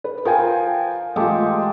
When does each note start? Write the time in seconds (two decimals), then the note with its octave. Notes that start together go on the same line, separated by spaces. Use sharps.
0.04 B4
0.25 F3 A#4 G5 G#5
1.16 A1 G#3 F4 G4 A4